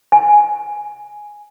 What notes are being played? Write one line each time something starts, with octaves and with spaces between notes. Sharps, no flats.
G#5